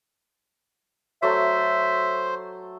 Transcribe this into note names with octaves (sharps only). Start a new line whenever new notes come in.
F#3 A3 A4 C5 E5